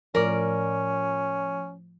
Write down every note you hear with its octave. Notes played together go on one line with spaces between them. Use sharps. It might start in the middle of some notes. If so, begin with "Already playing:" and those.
A2 F3 C#4 A#4 D5